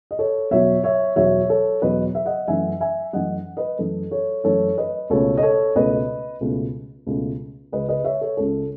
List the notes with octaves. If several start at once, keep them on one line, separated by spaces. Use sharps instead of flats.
D#5
A4 C#5
E2 B2 F#3 C#5 E5
C#5 E5
E2 B2 F#3 C#5 E5
A4 C#5
E2 B2 F#3 B4 D#5
E5
D#5 F#5
F#2 E3 A3 E5 G#5
E5 G#5
F#2 E3 A3 D#5 F#5
B4 D#5
F#2 E3 A3 A4
A4 C#5
F#2 E3 A3 A4 C#5
B4 D#5
C#2 B2 A3 A4 C#5
D#5
A4 C#5
C#2 B2 A3 B4 D#5
C#2 B2 A3
C#2 B2 A3
C#2 C#3 G#3 B4 D#5
B4 D#5
C#5 E5
A4 C#5
C#2 C#3 G#3 A4